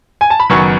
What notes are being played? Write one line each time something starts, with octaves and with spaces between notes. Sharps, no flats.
G#5
A5
B5
F#1 F#2 D#3 F#3 B3 C#6